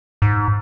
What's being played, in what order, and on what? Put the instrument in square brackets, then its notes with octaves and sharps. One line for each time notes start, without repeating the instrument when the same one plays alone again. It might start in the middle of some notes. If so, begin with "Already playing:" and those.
[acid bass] G#2